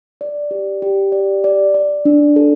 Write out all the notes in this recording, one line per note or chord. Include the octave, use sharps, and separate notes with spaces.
D5
G4
G4
D5
D5
D5
D4
A4